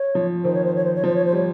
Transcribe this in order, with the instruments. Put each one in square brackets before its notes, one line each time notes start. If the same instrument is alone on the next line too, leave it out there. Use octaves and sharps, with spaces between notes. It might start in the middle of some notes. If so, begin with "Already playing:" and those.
Already playing: [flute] C#5
[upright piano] F3
[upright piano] D#3 [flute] C5
[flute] C#5
C5
C#5
C5
C#5
[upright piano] F3 [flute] C5
[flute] C#5
C5
[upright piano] G3 [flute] C#5